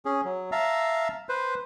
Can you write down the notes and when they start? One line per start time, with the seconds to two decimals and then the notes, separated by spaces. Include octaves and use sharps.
0.05 C#4 G#4
0.25 F#3
0.52 E5 F5 A5 A#5
1.29 B4 C5